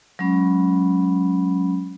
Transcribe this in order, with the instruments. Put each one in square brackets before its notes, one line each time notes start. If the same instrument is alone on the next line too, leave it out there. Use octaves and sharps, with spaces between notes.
[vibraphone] F#3 G#3 C#4 B5